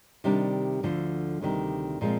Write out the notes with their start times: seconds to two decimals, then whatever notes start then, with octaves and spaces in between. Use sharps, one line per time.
0.24 C3 D#3 G3 D4
0.83 D2 D3 F3
1.41 D2 C3 D#3 G3
2.01 A#2 F3 G#3 C4